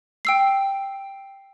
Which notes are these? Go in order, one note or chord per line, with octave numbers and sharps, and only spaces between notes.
G5 E6 C7